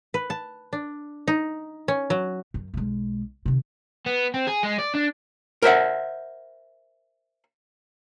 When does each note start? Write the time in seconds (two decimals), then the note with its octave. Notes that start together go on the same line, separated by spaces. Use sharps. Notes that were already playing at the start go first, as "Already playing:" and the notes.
0.14 B4
0.30 A5
0.73 D4
1.28 D#4
1.88 C#4
2.10 F#3
2.54 F#2
2.74 B1 G#3
3.46 C3 D#3
4.06 B3
4.34 C4
4.47 G#4
4.64 G#3
4.79 D5
4.95 D4
5.62 A#4 C5 E5 F#5